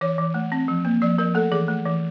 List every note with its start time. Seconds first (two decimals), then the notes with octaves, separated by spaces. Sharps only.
0.01 E3 C#5
0.18 E3
0.34 A3
0.52 C4
0.68 F3
0.85 A#3
1.02 F3 D5
1.18 F3 A#4
1.35 A3 A4
1.52 E3 G#4
1.68 A3
1.85 E3